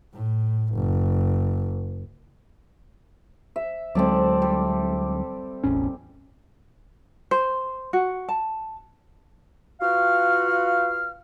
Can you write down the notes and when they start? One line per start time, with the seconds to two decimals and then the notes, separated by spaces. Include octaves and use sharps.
0.14 A2
0.74 F#1
3.56 E5
3.95 D2 F#3 G#3 C4 A4 D5
4.42 G3
5.64 E1 A1 C#4
7.31 C5
7.93 F#4
8.29 A5
9.80 F4 F#4 B4 F5 F6